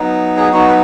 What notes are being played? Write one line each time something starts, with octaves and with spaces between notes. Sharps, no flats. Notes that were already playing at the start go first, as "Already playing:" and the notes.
Already playing: F#3 B3 D#4
G#4
F#3 B3 D#4 F#4
B4